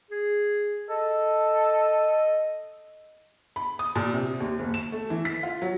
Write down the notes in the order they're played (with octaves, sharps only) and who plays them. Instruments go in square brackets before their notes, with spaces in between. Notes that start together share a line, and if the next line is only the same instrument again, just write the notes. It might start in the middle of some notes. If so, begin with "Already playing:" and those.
[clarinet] G#4
[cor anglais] A4 [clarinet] D#5
[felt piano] B5
D#6
A#2
C3
D#2
F#1
E7
A3
E3
B6
F4
F#3